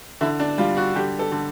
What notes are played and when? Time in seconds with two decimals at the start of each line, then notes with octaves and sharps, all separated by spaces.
0.21 D3 E4
0.40 D4
0.58 G3 F4
0.77 F#4
0.96 D3 G4
1.19 A4
1.32 D3